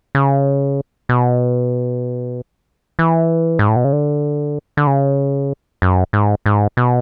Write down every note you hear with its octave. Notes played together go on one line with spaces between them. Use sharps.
C#3
B2
E3
G#2
A2
B2
C#3
D3
D3
C#3
F#2
G#2
G#2
B2